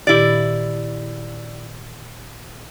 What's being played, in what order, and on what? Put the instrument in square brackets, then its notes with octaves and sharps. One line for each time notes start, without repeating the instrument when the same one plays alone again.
[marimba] A#2 D#3 G4 [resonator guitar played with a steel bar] E4 D5